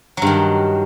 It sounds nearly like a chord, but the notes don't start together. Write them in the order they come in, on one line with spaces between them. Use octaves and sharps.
F#3 G2 D#3